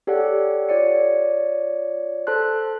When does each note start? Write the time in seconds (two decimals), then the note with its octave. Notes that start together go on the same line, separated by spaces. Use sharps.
0.07 G4 A4 C#5 D5 F#5
0.69 F4 C#5 D5 C#7
2.27 A4 C5 A5 C6 F#6